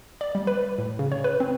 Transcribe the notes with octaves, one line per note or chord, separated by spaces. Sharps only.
D5
G3
B4
A2
C#3
C#5
B4
C4